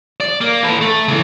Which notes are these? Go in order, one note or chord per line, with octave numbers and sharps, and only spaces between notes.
D5
A#3
A4 B4
A3
C#3 E3